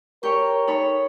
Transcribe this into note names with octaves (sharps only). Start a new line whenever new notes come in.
G4 A#4 C#5 G5 C#6
D#4 A4 C#5 B5